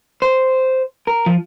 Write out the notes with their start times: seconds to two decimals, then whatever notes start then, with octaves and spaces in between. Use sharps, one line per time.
0.22 C5
1.07 A#4
1.26 F3